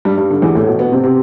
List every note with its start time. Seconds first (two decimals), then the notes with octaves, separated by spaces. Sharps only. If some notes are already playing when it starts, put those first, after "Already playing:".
0.05 G2 G3
0.18 G2 G3
0.30 D3
0.42 E2 E3
0.55 A2 A3
0.67 B2 B3
0.79 B2 B3
0.92 C3 C4
1.04 C3 C4